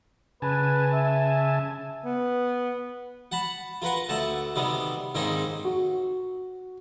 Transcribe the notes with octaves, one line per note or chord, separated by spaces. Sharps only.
C#3 B4 G#5 A5
E5
B3
F#5 A5 B5
F4 A#4 B4 F#5
D2 A3 F#5 A5
C3 D#3 G3 B3
G#2 D#3 A#3 C4 C#4 D#4
F#4